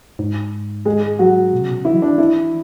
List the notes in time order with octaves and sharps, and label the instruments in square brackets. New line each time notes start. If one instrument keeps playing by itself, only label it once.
[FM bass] G#2
[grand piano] G#3 G#4
F#3 F#4
[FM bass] B2
C#3
B2
C#3
[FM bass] E3 [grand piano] E4
[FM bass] F#3
[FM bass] E3 [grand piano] D4
[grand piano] E4